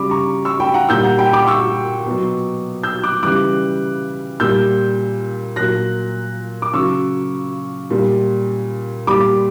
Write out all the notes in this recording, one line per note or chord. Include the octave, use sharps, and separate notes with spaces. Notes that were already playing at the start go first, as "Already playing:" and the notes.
Already playing: C#3 G3 B5 D6
A#5 C#6
C#6 E6
G5 B5
F#5 A#5
A#2 G3 E6 G6
F#5 A#5
G5 B5
B5 D6
C#6 E6
B2 F#3
E6 G6
D6 F#6
C#3 E3 G3 D6 F#6
A#2 G3 E6 G6
A#2 F#3 F#6 A#6
D6
C#3 F#3 C#6 E6
A#2 G3
A#2 G3 B5 D6